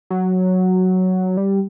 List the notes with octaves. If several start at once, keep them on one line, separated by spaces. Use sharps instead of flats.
F#3
G3